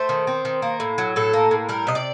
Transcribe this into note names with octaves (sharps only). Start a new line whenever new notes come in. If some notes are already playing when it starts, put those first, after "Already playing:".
Already playing: A3 C5
D#3
C4
D#3
A#3
A2
F#3
A2 A4
A#3
A2
G3 A#4
C3 D#5
D5